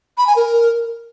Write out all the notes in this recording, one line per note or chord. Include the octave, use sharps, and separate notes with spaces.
B5
G#5
A#4